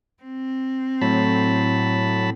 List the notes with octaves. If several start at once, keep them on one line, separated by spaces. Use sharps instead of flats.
C4
A2 F#3 A5 B5